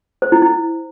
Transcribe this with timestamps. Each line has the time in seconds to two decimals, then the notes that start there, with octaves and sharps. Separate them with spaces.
0.22 C5
0.32 E4
0.42 E4